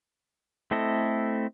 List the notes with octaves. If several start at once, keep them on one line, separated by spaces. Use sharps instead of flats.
A3 C4 E4 A4 D#5